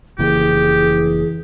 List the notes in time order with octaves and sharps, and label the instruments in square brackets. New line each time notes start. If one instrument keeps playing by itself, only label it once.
[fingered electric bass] F1 C#3 A#3 [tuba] E3 [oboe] G4 [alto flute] G#4